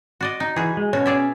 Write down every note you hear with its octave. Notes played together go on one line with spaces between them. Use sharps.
F#4 D5 D#5
D#4
E3 F#4 G#4
G#3
B2 C#4 F#4 C#5
G#4 D5 E5